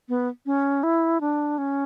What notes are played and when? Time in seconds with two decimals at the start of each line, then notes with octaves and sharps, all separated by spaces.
0.09 B3
0.46 C#4
0.83 E4
1.21 D4
1.58 C#4